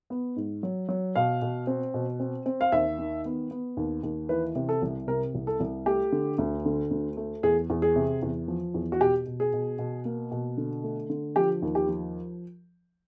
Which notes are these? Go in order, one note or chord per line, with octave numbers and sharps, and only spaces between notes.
B3
G#2
F#3
F#3
B2 F5
B2
C4
B2
C4
C4
F5
D#2 E5
D#3
B3
B3
D#2
D#2
E3 B4
C3
A4
C2
C3 A#4
C2
A4
C2
A3 G4
D3
D2
D3
D2
A3
E2 G#4
E2
G#4
C3
E2
F3
E2
F#4
B2 G4
B2
G#4
B2
B2
A#3
B2
D3
A3
D3
F3 G4
D#2
G4
F3